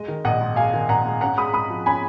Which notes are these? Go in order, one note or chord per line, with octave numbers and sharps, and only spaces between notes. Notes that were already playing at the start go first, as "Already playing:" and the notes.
Already playing: G#3 D#5
D#3
A#1 D#5 F#5
G#2
G#3 F5 G#5
D#3
A#1 F#5 A#5
G#2
C#4 F#5 A#5
G#3 B5 D#6
G#2 B5 D#6
F3
C#4 G#5 B5